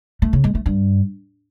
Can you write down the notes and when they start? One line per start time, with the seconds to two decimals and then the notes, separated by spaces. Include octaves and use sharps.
0.22 A3
0.33 C#3
0.44 G#3
0.55 A3
0.66 G2